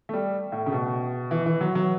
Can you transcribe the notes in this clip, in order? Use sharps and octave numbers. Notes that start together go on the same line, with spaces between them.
A3
G3
A2
C#3
B2
E3
E3
F#3
F#3